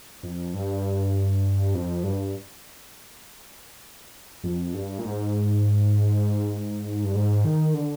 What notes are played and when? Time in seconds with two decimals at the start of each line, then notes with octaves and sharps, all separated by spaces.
0.23 F2
0.54 G2
1.74 F2
2.03 G2
4.44 F2
4.74 G2
4.99 A#2
5.05 G#2
7.04 G2
7.15 G#2
7.44 D#3
7.74 D3